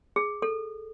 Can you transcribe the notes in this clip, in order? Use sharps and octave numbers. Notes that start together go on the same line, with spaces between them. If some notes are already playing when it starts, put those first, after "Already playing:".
G#4
A4